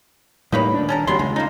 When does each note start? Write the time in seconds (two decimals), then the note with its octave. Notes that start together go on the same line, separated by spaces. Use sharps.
0.52 A2 G3 A#3 D#4 B4 C#5
0.74 D#1 D4
0.89 C#4 A4 A#4
1.07 D#1 D#2 F#3 G3 B3 C6
1.19 C#2 G#3
1.36 A#3 D#4